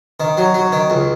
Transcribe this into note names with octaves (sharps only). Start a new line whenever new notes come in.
D#3
F#3
F#3
D#3
C#2